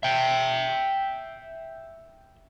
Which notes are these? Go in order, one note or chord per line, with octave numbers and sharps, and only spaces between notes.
E5 G5